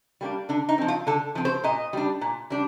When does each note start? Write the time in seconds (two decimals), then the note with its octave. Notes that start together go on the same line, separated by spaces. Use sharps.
0.21 G3 A#3 D4
0.49 D3 D4
0.69 D#4
0.78 F3 C4
0.88 F4
1.07 D3 A4
1.35 F3 C4
1.45 C5
1.64 A#2 D#5
1.93 G3 D4
2.21 A#2
2.50 G3 D4